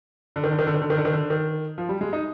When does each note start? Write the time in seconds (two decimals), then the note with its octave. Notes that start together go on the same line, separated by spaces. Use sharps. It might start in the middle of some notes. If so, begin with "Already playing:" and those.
0.36 D3
0.44 D#3
0.51 D3
0.59 D#3
0.67 D3
0.74 D#3
0.82 D3
0.90 D#3
0.97 D3
1.05 D#3
1.13 D3
1.30 D#3
1.78 F3
1.89 G3
2.01 G#3
2.13 D#4